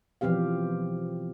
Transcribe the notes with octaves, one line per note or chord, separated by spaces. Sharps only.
B2 E3 F3 C4 G4 F5